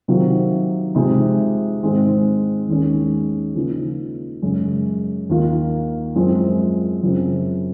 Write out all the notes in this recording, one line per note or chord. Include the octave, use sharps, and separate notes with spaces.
C3 D#3 F#3 C4 F4
C3 F3 G#3 D#4
G#2 D#3 G#3 C4
D#2 D#3 G#3 C#4
C#3 F3 A#3 D#4
F#2 C#3 G#3 C#4
D#2 D#3 A#3 F4
F#2 F3 G#3 C4
F#2 C#3 F3 C4